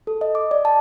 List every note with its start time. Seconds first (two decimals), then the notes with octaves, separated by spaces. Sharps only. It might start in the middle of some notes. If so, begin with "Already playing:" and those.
0.07 A4
0.21 D#5
0.35 D6
0.51 D5
0.65 A5